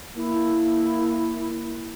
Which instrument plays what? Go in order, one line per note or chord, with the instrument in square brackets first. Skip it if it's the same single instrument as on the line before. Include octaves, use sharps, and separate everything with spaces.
[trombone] A#3 [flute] E4